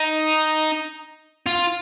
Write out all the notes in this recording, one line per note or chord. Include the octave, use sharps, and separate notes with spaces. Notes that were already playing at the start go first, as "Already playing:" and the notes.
Already playing: D#4
F4